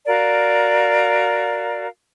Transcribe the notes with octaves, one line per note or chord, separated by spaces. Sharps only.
F#4 A#4 D5 F5